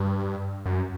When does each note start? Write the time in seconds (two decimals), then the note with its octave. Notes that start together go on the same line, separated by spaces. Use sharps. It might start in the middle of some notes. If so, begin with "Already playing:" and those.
Already playing: G2
0.66 F#2